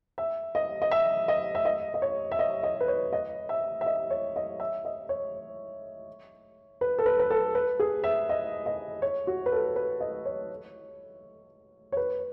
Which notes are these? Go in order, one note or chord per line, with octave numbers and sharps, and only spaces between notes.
E5
D#5
D#5
E5
D#5
E5
D#5
D#5
C#5
E5
D#5
D#5
B4
C#5
D#5
E5
E5
D#5
C#5
D#5
E5
D#5
C#5
B4
A4
B4
B4
A4
B4
G#4
E5
D#5
D#5
C#5
F#4
B4
A4
B4
D#5
C#5
C#5
B4